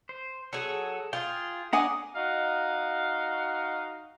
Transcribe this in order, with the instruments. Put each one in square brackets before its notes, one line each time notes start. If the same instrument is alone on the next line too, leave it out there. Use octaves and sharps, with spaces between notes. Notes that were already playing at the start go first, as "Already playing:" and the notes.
[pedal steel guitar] C5
[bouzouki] F#3 G#4 [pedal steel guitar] A4
[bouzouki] F4 [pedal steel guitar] G#4 G5
[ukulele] D4 F#5 G#5 [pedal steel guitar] A#5 D6 [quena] D#6
[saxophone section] D#4 F#4 D#5 F5